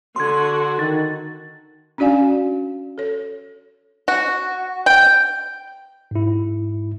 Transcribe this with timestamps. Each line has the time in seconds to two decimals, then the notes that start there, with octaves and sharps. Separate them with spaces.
0.16 D3 F#4 C6 G#6
0.79 D#3 A6
1.98 C#4 D4 F#4 D5 F5 G#5
2.98 A4 C#5
4.08 F#4
4.86 G5
6.11 G#2 E4